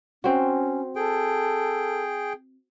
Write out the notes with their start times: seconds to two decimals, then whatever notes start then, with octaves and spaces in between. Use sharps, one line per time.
0.24 C4 C#4 F#4
0.96 G#4 A4 G5